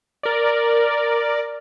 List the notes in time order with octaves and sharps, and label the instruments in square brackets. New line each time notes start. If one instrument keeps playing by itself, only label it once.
[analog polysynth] A#4 D5